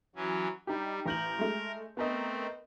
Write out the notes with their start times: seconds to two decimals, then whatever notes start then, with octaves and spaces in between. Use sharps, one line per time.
0.16 E3 F#3 C#4
0.67 G3 D#4 G4
1.06 A1 A#4 G6 F#7
1.39 G#3 A3
1.97 A3 B3 C4 A#4 D#5